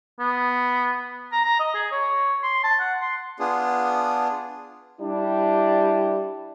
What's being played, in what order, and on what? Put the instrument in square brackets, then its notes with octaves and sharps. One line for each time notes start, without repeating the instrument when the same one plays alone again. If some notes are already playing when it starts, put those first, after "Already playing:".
[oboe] B3
A#5
A#5
D#5
G#4
C#5
C6
A5
F#5
C6
[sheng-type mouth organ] B3 D4 F4 G#4
[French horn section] G3 D4 E4